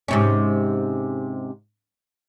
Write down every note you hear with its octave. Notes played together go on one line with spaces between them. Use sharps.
G#2 C3 C#4